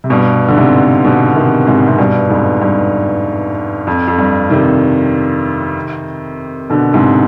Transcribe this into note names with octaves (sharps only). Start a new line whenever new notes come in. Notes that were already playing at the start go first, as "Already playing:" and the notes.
C3
G2 B2
D3
G#2 C3
B2 D3
C3 D#3
G#2 C3
C3
G2 B2
F2 G#2
G2
F2
F2
G2
C3 D#3
B2 D3
G#2 C3